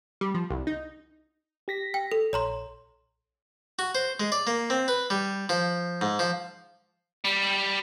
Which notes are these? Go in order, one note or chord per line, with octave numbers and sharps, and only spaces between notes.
G3
F3
C2
D#4
G4 A#6 B6
G5
A4
A#1 C#5 A#5 C6
F#4
C5
G#3
D5
A#3
C4
B4
G3
F3
G#2
F3
G3